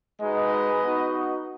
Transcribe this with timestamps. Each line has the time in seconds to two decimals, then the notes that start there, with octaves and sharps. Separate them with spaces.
0.21 G#3 D#4 F#4 B4 D#5
0.84 B3 D#4 F#4